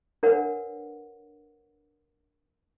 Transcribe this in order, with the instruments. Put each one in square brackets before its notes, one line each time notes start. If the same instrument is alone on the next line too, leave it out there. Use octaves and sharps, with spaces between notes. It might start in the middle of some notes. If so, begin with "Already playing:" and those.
[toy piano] D4 A#4 B4 C#5 F#5